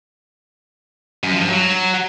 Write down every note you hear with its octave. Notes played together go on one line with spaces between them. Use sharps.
F#2
F3
G2
F#3